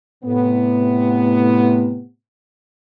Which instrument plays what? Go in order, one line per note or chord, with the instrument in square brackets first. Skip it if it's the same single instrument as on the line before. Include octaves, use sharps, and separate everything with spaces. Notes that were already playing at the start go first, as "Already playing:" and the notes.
[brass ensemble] A2 C3 B3